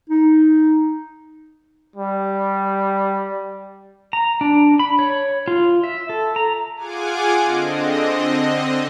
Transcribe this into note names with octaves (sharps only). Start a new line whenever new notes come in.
D#4
G3
A#5
D4
B5
C#5
F4
E5
A4
A#5
F4 G#4 F#5 G#5 D6
D3 C4 D#5